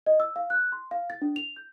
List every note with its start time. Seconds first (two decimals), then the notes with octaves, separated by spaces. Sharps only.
0.06 D#5
0.20 E6
0.36 F5
0.50 F#6
0.72 C6
0.91 F5
1.10 A6
1.22 D4
1.36 F7
1.56 G6